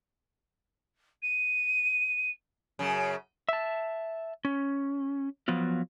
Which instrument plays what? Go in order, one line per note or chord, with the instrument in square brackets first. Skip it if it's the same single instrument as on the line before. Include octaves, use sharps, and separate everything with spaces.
[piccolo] D#7
[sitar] F#2 C#3
[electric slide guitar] E5 A5
C#4
F3 F#3 B3 F4